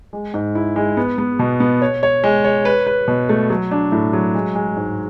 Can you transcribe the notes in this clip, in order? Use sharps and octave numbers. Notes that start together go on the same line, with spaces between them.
G#3
G#2
E4
G#3
B3
B3
B2
B3
C#5
C#5
G#3
C#5
B4
B4
B2
A3
F#3
D4
A2
F#3
G#3
G#3
G#2